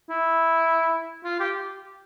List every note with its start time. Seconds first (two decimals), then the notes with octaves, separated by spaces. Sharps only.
0.10 E4
1.24 F4
1.40 G4